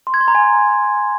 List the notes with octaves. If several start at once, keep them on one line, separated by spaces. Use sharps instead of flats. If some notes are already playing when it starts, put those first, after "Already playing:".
C6
G#6
C6
A#5
G#5